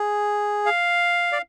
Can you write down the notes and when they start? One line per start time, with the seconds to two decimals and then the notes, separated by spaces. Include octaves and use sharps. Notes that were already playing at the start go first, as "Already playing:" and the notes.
Already playing: G#4
0.66 F5
1.32 D5